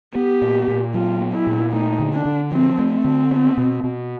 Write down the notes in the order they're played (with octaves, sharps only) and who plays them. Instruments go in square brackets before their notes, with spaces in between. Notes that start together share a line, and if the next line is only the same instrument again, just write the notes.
[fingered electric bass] B3 [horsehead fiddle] G4
[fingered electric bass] A#2
A#2
[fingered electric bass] F#3 [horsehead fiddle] F4
[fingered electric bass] B3
[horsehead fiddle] E4
[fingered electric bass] A#2
[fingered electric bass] A3 [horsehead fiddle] D#4
[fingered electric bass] D3
[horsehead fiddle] D4
[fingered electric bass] D3
[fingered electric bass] F3 [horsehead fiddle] C4
[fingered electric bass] A3
[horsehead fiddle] C4
[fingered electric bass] D3
B3
B2
B2